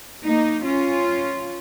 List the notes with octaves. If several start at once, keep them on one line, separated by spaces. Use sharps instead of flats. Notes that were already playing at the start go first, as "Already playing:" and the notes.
A#3 D#4
C#4 F4